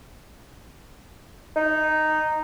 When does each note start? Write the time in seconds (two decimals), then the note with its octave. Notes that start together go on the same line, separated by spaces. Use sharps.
1.56 D#4